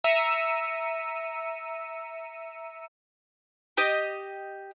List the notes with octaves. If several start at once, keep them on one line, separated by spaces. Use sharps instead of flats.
E5 A#5 E6 C#7 D#7
G4 D#5